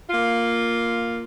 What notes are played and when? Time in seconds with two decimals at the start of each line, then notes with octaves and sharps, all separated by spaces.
0.10 A#3 F4